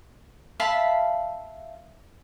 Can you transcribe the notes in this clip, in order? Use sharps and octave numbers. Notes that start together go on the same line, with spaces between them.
E5 F5 A5 B5